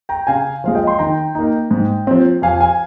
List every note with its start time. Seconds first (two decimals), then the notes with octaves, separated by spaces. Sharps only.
0.09 G5 A#5
0.27 C#3 F5 G#5
0.64 F3 G#3 F5
0.75 D#5 G5
0.87 C6
0.99 D#3 G5 A#5
1.35 A#3 D#4
1.71 G#2
2.07 F3 C4
2.42 F2 F5 G#5
2.61 F5 G#5